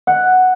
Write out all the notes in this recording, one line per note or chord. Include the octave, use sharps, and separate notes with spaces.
F#5